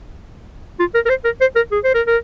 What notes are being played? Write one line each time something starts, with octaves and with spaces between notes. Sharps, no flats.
F4
A#4
A#4
C5
A#4
C5
A#4
G#4
C5
A#4
A#4